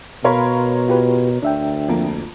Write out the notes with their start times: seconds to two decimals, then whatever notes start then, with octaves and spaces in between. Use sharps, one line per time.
0.25 B2 A#4 C#5 F5 B5 C6
0.88 F4 G4 B4
1.43 D2 D4 E5 G5
1.88 F2 A#3